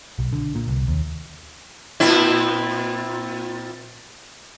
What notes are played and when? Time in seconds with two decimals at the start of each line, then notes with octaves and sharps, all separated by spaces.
0.19 B1
0.33 D3
0.55 A#2
0.68 C2
0.88 D#2
2.00 A#2 C4 E4